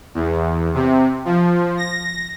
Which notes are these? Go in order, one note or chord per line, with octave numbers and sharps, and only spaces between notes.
E2
C3
F3
A#6